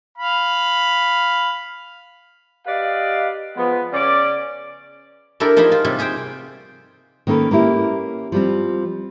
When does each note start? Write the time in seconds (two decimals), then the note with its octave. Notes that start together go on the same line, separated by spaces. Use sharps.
0.18 F5 B5
2.66 G4 B4 D5 D#5 F5
3.57 F3 G#3 B3
3.93 C#3 C#4 D5
5.40 D4 E4 G4 A4 A#4
5.57 F3 D#4 F4 G#4 C5 B5
5.72 F4
5.84 C3 G3 C#5
5.99 G4 G#4 C5 G5
7.27 D#3 A#3 C#4 A4 B4
7.51 A#3 C#4 E4 G4
8.32 F3 G3 C4